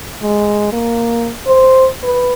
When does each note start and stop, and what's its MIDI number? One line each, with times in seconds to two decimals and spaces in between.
0.22 0.69 56
0.73 1.32 58
1.47 1.88 72
2.03 2.34 71